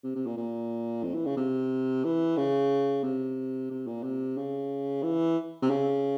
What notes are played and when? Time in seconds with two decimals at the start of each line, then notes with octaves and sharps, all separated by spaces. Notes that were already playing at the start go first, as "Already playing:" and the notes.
0.04 C3
0.16 C3
0.27 A#2
0.37 A#2
1.04 F2
1.15 E3
1.26 C#3
1.37 C3
2.05 E3
2.37 C#3
3.04 C3
3.71 C3
3.87 A#2
4.04 C3
4.37 C#3
5.03 E3
5.62 C3
5.70 C#3